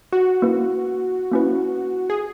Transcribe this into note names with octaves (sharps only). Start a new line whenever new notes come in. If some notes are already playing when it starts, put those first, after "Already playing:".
F#4
A#3 C#4 E4 B4
A#3 C#4 E4 B4
G#4